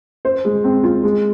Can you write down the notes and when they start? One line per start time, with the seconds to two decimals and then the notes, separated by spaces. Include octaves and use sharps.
0.25 C5
0.45 G#3
0.64 C4
0.84 F4
1.04 G#3